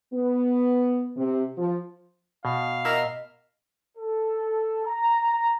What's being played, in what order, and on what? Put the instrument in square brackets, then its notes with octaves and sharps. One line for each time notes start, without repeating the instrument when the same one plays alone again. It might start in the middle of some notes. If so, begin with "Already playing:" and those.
[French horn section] B3
C3
F3
[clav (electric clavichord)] B2 [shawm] F5
[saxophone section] A#4 E5 [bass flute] D#5
[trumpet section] A4
A#5